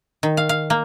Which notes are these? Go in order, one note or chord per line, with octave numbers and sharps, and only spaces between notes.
D#3
F5
F5
A#3